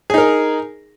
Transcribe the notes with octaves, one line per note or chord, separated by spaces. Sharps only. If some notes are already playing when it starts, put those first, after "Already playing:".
D#4 G#4 A#4